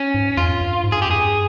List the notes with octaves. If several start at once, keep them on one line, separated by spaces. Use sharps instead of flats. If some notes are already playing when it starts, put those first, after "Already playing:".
Already playing: C#4
G#2
F2 F4
G2
G#2
G2 G#4
G4
F2 G#4
G2